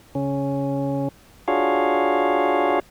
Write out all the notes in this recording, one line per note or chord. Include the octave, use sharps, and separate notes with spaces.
C#3 C#4
D4 F4 F#4 G#4 C#5 F5